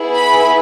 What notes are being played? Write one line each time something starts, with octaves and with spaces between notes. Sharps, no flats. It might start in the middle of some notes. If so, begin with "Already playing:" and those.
Already playing: B3 E4 G#4
B5